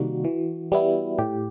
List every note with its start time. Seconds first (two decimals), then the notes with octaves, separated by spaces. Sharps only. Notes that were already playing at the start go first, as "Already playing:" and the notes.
Already playing: C3 D#3 G3 A#3 F#4
0.25 E3
0.72 G3 B3 E4
1.18 A2 G4